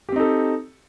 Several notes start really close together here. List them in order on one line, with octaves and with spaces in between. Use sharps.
G4 C4 D#4 A4